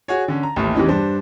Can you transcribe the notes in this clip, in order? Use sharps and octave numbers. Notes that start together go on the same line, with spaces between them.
F#4 G#4 C#5
D3 C#4
A#5
A1 D#2 A3
E2 C3 E3 C#4 D#4
G2 D4 C5